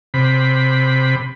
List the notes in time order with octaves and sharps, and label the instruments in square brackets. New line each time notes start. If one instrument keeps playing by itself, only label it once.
[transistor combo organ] C3 B5